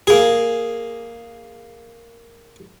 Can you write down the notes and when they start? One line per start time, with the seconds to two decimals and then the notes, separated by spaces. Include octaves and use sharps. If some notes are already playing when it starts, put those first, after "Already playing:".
0.07 A#3 G#4